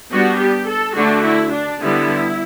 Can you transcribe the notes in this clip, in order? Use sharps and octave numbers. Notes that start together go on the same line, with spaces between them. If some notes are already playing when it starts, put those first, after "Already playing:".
G3 B3 D4 F#4
G4
A4
D3 A3 D4 F#4
E4
D4
D3 G3 B3 E4